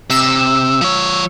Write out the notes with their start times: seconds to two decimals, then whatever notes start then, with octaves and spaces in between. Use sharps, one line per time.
0.10 C3 E6
0.81 F3 C#5